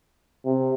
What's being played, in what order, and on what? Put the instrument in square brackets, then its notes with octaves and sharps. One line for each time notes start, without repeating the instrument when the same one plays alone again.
[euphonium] C3